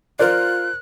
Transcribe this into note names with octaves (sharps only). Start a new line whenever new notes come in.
F4 A#4 C5 D5 F#6